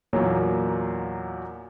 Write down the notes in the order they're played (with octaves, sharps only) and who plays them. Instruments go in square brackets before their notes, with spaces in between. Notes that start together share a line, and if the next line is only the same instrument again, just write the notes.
[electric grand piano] E2 A#2 F#3 A#3 D#4 C#5